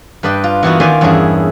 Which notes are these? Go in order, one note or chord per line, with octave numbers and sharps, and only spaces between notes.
G2 B4 D5 D#5 G5
F4
E3 A#3 B3 D#4 F4 F#4
D#3 F4 D5 E5 G#5 C6
E2 G2 C#4 E4 G#4